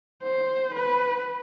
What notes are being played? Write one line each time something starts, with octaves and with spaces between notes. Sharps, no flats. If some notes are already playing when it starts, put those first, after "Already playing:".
C5
B4